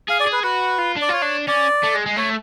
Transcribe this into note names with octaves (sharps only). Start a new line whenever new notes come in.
G#4 F5
D5
G#4
B4
F#4 B4
F4
D4
D5
F4 C#5
D4
C#4 D5
A3
G#3
G#3
A3 C#5